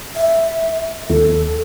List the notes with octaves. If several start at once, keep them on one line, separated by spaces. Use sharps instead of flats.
E5
D#2 A4